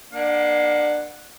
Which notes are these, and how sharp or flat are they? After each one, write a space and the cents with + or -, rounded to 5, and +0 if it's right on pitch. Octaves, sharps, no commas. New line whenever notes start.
A#3 +30 D4 +25 F#5 -5